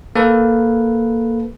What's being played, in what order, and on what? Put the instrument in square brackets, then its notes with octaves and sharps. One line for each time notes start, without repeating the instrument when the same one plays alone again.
[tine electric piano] A#3 A4 B4